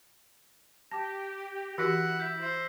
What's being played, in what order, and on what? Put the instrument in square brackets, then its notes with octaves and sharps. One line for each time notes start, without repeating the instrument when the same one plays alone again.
[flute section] G4 [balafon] A5 [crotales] D6 A#6
[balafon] E3 F#4 G4 [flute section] E4 [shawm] F#5 [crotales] E6 A#6 B6
[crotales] G6 B6
[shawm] C5